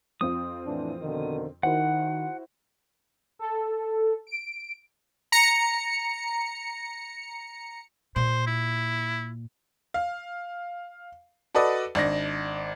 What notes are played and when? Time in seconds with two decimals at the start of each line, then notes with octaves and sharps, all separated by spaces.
0.21 F2 C4 F4 D#6
0.66 A2 E3 D4
1.01 B2 D3 D#3
1.63 D#3 E4 F#4 C5 F#5
3.39 A4
4.27 D7
5.32 A#5 C#7
8.16 A#2 C5
8.47 E4
9.94 F5
11.55 F#4 A4 B4 D5 D#5
11.95 G#1 D4 A#6